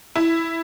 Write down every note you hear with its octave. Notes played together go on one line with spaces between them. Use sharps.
E4